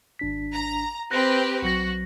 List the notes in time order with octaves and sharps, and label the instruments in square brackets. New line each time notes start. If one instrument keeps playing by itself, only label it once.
[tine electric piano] G#1 D4 B6
[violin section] A#5
[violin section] C4 G4 B4 [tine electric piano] F#6 A#6
[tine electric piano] B1 F#3 A#6 [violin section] F#4